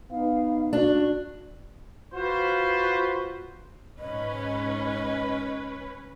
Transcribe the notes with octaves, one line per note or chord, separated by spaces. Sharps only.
B3 D#4 F5
D4 F#4
F4 F#4 B4 C5
G#2 C#4 B4 D#5